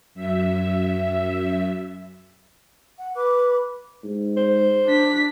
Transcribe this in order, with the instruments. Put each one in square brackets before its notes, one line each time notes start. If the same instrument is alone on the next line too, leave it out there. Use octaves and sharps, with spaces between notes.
[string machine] F#2 E5
[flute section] F#5
B4 D6 F#6
[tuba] G#2
[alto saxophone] C5
[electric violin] D4 B6